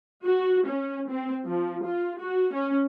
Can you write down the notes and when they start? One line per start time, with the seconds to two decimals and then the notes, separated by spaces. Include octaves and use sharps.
0.25 F#4
0.66 C#4
1.09 C4
1.45 F3
1.84 F4
2.19 F#4
2.53 C#4